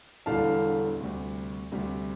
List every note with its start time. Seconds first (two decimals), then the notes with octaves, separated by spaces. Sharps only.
0.26 E1 E2 D3 G3 F5 A5
1.00 D2 C3 G3
1.72 D2 C3 G3